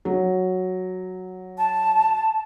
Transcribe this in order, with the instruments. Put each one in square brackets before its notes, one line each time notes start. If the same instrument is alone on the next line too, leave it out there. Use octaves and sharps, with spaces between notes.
[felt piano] F#3
[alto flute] A5